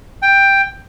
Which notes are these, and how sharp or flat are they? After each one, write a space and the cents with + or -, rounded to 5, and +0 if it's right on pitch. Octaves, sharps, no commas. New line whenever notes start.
G5 +10